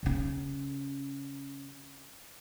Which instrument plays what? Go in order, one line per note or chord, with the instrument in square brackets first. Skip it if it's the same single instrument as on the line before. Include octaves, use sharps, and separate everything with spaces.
[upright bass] C#3 C#4